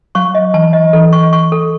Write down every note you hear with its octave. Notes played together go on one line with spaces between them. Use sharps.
F#3 C#6
D#5
E3 A5
D#5
E3 A4
C#6
C#6
A4